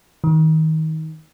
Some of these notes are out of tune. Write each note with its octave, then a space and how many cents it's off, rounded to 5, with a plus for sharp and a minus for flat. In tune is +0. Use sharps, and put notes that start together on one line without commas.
D#3 +25